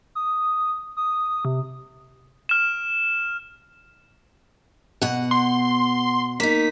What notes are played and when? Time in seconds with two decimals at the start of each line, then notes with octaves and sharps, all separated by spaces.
0.15 D#6
0.97 D#6
1.45 C3
2.49 F6 E7
5.02 B2 F#5
5.31 C6
6.40 A#3 D#4 B6